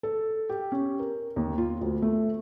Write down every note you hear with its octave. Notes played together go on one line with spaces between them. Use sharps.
A4
G4
C#4
A#4
D#2
F4
D2
A3